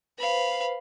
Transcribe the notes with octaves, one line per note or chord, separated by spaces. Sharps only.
B4 C5 F5 B5